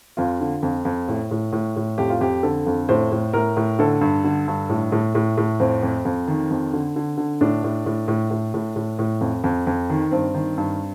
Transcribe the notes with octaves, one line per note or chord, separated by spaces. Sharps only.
F2 F4
D3
F2
F2
A2
A2
A2
A2
F2 G4
F4
F2 G4
D3 A4
F2
A2 C5
A2
A2 A#4
A2
D3 A4
G2
D3
G2
A2
A2
A2
A2
F2 C4
F2
F2
D#3
F2
D3
D3
D3
A2 D4
A2
A2
A2
A2
A2
A2
A2
F2
F2
F2
D#3
G2 C4
D#3
G2